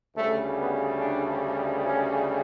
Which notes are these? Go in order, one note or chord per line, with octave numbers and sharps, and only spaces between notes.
D2 C#3 G3 A3
B3
D4
C#4